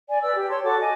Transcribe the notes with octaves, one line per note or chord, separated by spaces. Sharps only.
D5 G#5
B4 D5 E6
G4
C#5 A5 C6
F#4 A4 F#5 D6
D#5 G#5 D6